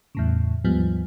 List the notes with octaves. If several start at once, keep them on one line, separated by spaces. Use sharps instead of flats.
E2 A2 C#3
D#2 G#2 F3 G3 B3